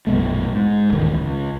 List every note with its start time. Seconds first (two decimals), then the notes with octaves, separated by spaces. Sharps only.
0.07 A#1 F#2 B2 A3
0.53 G#2
0.92 D#2 A2 D#3 E3
1.12 C#2